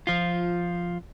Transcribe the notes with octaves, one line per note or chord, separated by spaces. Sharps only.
F3 F4